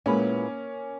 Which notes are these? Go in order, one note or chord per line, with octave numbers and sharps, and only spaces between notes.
A#2 G#3 A#3 B3 C#4 E4 B4